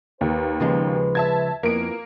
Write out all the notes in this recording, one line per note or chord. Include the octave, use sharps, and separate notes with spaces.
D#2 B4
C#3 F3 G#3
E5 A5 G#6
F2 F3 A#3 B3 E4 F4 D7